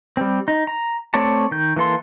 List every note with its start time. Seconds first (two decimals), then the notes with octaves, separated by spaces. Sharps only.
0.17 G3 C4
0.48 D#4
0.67 A#5
1.14 A3 C4 C#5 D5 A5
1.51 D#3 G6
1.76 E3 A#3 A4 C6